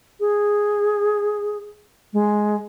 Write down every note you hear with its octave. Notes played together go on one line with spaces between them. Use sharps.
G#4
G#3